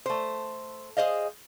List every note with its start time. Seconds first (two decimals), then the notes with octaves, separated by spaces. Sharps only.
0.06 A3 C5
0.97 G#4 C5 D#5 F5